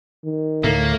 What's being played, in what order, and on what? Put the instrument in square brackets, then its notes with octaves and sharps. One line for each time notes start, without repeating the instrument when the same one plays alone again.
[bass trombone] D#3
[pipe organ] D2 D3 A3 [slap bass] A2 [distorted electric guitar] A#3